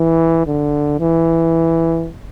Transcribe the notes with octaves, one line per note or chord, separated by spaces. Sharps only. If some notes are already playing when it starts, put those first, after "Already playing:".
Already playing: E3
D3
E3